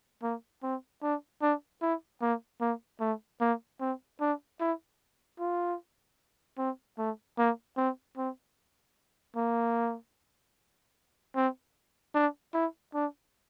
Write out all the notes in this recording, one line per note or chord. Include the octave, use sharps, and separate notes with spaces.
A#3
C4
D4
D4
E4
A#3
A#3
A3
A#3
C4
D4
E4
F4
C4
A3
A#3
C4
C4
A#3
C4
D4
E4
D4